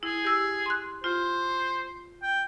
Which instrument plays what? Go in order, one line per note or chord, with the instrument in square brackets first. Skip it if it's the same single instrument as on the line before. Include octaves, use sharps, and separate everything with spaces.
[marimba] E4 [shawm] G#4
[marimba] G4 E6
C6 F#6
[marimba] F4 [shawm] C5
[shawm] G5